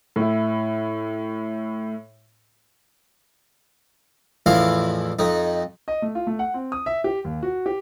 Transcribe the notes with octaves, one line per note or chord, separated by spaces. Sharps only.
A2 E4
A1 E2 F3 E4 F5
F2 D#4
D#5
A3
F4
A3
F#5
C4
D#6
E5
G4
D#2
F#4
G4